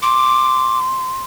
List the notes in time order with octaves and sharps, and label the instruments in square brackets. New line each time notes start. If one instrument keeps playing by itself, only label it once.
[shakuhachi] C6 [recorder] D6